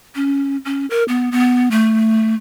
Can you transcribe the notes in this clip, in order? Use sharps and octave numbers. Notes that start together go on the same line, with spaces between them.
C#4
C#4
A#4
B3
B3
A3